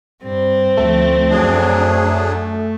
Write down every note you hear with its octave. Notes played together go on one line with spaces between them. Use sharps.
G2 C4
D2 F3 A3
F#2 F#3 D4 G#4